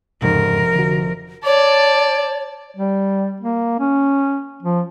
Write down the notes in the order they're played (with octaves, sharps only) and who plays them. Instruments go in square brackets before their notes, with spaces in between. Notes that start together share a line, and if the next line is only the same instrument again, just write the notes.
[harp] F1 [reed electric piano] E2 G#2 C#3 [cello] A#4
[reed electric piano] D3 F#4
[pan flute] C#5 [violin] D5 A5
[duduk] G3
A#3
C#4
F3